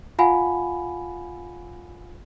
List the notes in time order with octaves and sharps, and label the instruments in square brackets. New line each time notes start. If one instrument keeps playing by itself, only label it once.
[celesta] F4 F5 F#5 G#5 B5